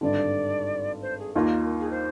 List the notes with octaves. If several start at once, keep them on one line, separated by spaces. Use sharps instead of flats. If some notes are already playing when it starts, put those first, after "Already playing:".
G#1 G2 D3 D5
C5
G#4
D#2 D#3 A#3 F4 A#4
G#4
C5